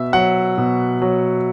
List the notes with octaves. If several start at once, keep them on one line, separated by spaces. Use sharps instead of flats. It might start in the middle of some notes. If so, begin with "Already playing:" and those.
Already playing: B2 E5
F#3 F#5
B2
F#3